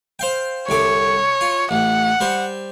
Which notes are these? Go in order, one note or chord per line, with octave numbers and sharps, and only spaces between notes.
C5 F5 G5
C2 D3 C#5 D6
F4
A1 F#5
G3 C5